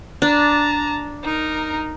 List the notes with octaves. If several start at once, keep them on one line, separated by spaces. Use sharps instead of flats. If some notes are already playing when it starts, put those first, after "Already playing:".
D4 A5 A#5
D#4 A#4